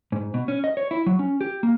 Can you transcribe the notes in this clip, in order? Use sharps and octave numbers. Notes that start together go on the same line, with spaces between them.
G#2
B2
C#4
D#5
C#5
E4
F#3
C#4
G4
A#3